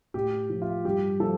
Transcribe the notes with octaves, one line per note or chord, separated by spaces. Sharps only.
A2 G4
F3
F4
G2 G4
F3 A4